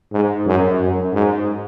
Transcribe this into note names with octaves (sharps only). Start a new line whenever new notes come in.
G#2
F#2
F#2
G#2